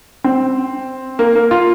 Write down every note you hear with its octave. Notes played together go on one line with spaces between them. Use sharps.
C4
A#3
A#3
F4